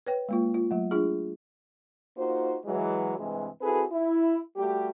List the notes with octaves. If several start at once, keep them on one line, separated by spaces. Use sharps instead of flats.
B4 C#5 G5
G#3 A#3 F4
F4
F#3 A3
D4 F4 G#4
A#3 D#4 F4 F#4 C5
E3 F#3 G#3
G2 C3 E3 G#3
C4 E4 F#4 G#4 A4 B4
E4
G3 A3 F#4 G4